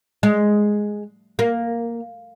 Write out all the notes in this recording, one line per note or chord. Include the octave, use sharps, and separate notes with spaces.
G#3
A#3